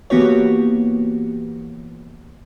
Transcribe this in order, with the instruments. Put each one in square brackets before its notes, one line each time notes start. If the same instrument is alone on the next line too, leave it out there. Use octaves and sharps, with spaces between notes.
[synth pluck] E3 A#3 B3 F#4 G4 C#5